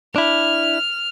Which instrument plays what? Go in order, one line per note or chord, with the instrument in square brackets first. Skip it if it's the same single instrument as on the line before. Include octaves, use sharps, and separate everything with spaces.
[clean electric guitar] D4 E4 [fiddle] F6